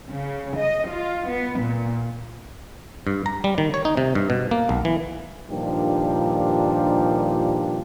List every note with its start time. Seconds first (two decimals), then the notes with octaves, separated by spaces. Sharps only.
0.11 C#3
0.58 D#5
0.91 F4
1.29 B3
1.60 A#2
3.07 G2
3.26 A#5
3.44 G3
3.58 D#3
3.74 C#5
3.85 D#4
3.97 C3
4.15 G2
4.30 B2
4.51 A#3
4.69 B1
4.85 E3
5.49 G2 A#2 D#3 F3 D4 G4